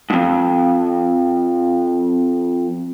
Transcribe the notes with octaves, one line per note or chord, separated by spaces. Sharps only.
F2 G#2